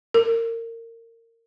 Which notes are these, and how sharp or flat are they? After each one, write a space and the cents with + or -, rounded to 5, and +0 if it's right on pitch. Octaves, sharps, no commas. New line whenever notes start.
A#4 -25